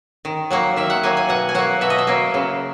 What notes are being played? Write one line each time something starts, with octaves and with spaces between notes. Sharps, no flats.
D#3
F#3 A#3 F#5
D#3 E5
F#5
F#3 A#3 G#5
G#5
B2 F#5
G#5
F#3 A#3 F#5
B2 E5
D#5
E5
F#3 A#3
C#3